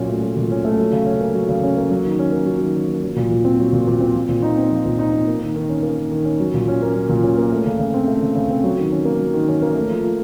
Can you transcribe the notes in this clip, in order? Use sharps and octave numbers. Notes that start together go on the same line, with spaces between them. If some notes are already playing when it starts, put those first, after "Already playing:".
Already playing: A#2 F#3 C#4
A3
F#3
A#2
C#4
A3
F#3
C#3
C#4
A#3
F#3
C#3
C#4
A#3
F#3
D#3
C#4
A#3
F#3
D#3
C#4
A#3
F#3
A#2
A#2
C4
F#3
A#2
A#2
C4
F3
A#2
D#4
C4
F3
A#2
D#4
C4
A#3
D#3
D#3
C#4
A#3
D#3
D#3
C#4
F#3
A#2
C#4
A#3
F#3
A#2
C#4
A#3
A3
C#3
C#3
C4
A3
C#3
C#3
C4
F#3
D#3
C#4
A#3
F#3
D#3
C#4
A#3
A3
F3
F3